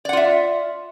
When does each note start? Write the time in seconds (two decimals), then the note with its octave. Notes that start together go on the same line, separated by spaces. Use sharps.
0.05 D5
0.09 F#5
0.13 F4
0.17 E5